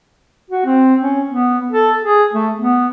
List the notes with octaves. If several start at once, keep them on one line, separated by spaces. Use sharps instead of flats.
F#4
C4
C#4
B3
A4
G#4
A3
B3